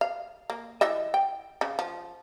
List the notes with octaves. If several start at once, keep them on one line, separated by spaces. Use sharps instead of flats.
F5
A#3
E3 D#5 E5
G5
C#3
F3